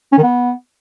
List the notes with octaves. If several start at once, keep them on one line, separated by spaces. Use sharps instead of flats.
C#4
D#3
B3